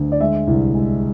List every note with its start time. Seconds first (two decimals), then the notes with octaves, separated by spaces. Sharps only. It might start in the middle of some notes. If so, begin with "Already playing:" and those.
Already playing: D2
0.12 D5
0.20 G#3 E5
0.47 C2
0.74 G#3